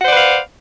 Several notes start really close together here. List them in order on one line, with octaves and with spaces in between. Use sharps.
F#5 C5 D5 B4 F5